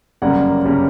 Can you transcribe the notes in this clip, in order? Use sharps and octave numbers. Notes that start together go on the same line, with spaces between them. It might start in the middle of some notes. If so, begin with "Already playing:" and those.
G1 F#2 C#3 G3 A#3 D5 F#5
G1 C#3 G3 A#3